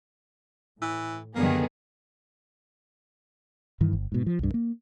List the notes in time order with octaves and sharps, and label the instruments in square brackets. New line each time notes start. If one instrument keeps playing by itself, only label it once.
[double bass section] A2 [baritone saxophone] E3
[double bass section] F#2 D3 G3 [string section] D#3 G#4 [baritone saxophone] A#3 [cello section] B3
[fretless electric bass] G2 D#3 E3
G1
G#2 B2
F3
C2 G2
A#3